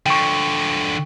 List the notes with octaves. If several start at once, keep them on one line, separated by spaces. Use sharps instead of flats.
D3 F3 G5 C#6